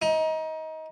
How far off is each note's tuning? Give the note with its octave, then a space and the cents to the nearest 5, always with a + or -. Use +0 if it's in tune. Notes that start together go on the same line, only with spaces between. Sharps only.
D#4 +25